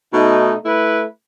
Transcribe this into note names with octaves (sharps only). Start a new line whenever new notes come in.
B2 A3 D#4
A3 E4 B4